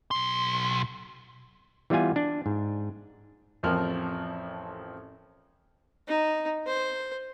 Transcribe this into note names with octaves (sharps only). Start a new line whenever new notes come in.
B1 C6
E3 G3 B3 F4 G#5
D4
G#2
A1 F2 F3 C4 A#4 F6
D#4
C5